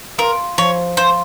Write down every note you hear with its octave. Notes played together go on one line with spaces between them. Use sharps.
F4 A#4
F3 C#5
F4 C5